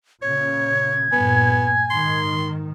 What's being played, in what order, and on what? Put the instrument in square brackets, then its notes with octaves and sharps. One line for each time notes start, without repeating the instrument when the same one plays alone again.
[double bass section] A#2 C#3 [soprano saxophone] C#5 [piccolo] G#6
[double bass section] G2 A#2 [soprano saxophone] B3 [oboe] G#5
[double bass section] G#2 D#3 [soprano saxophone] C6